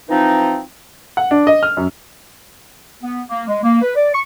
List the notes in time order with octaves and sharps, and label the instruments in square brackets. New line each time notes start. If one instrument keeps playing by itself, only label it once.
[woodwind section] E3 F3 C4 D#4
[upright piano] F#5
D4
D#5
F6
F#2
[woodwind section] B3
A#3
G#3
A#3
B4
D5
C#6